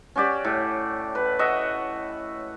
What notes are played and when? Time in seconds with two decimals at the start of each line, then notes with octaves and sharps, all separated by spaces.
0.16 C#4 F#4 G4 D5
0.45 A2
1.15 B4
1.39 F#4 D#5 E5 F#5